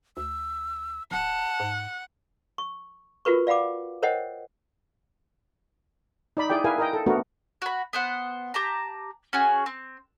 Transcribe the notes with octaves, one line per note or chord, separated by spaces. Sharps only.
D2 E6
D1 F#5 A5
G#2
C#6
F4 F#4 A#4 B4 C#6
D5 F5 F#5 B5 D6
A#4 C5 C#5 D#5 F#5 G5
D#4 D5 B5
E4 G#4 D5 G5
E4 G#4 A#4 B4 F5 G#5
A#4 D#5 G5
A4
A3 B3 D4 F#4 A#4
F#4 B5
B3 C5 F#5
G4 A5 A#5
C#4 F#4 G#4
C4